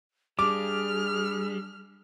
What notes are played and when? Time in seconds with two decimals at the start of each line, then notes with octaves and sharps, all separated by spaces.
0.39 G3 D4 G#4 D6 F6